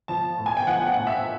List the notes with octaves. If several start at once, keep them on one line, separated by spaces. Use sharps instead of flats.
F3 A5
A2
G#5
G5
F3 F#5
F#5
A2
E5